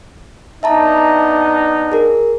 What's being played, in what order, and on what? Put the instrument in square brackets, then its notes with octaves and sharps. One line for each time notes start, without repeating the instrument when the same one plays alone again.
[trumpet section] B3 D4 D#4 [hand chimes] E5 A5 A#5
[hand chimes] G#4 A#4